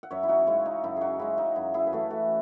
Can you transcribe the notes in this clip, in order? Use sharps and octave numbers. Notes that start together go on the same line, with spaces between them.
F#5
F#2 C#5 E5
E4
D#4 F#4
C#3 G#3 E4
D#4
F#2 E4
D#4 F#4 G#4
C#3 G#3 E4
D#4
F#2 E4
E4 G#4
B4
E3 A3 C#4 F#4 A4
F#4 A4